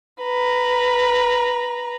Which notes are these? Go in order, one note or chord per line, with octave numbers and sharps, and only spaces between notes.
B4 A#5